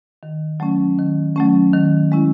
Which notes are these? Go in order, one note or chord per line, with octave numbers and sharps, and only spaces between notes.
D#3
F#3 A3 C#4
D#3
F#3 A3 C#4
D#3
G#3 C#4 E4